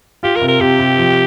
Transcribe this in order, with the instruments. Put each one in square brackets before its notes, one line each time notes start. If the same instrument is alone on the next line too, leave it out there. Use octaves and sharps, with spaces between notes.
[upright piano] F4 [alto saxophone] G4
[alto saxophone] A#4
[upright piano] C3
[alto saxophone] A#4
[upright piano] C3 [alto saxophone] G4
[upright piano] C3
F3